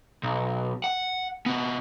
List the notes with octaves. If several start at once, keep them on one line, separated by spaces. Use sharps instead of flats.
B1
F#5
C3 B3